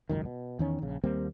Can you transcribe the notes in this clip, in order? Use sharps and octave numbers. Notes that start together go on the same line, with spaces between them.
G#1 C#2 F#2 D#3
B2
E2 D#3 C#4
A#1 C#3
D#2 G3 A#3 C4